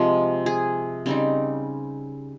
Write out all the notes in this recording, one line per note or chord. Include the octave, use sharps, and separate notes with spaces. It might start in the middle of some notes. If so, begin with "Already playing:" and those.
Already playing: C3 F3 G#3
G#4
C#3 G3 C4 D#4